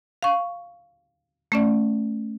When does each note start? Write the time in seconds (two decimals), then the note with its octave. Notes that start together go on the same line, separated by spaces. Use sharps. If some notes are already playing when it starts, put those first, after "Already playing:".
0.23 F5 C#6
1.52 A3 C#4 D5